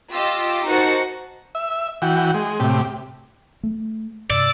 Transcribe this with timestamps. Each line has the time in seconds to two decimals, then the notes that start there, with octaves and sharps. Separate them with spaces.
0.11 F4 G4 D#5 D6 E6
0.66 D#4 F#4 A#4 C5 F#5 A5
1.55 E5
2.02 E3 F#4 G5
2.34 G#3
2.60 A2 C3 G4
3.63 A3
4.30 G2 C3 D5 E6